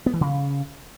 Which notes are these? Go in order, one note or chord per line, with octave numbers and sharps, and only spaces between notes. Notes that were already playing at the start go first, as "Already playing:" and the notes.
B3
E3
C#3